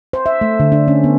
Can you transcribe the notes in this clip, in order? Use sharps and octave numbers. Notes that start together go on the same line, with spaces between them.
C5
E5
A3
D3
D4
C#4
B3